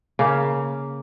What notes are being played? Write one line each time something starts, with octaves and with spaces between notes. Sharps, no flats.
C#3 A#3